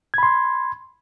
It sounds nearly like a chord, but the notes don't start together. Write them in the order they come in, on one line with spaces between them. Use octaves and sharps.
G#6 B5 C6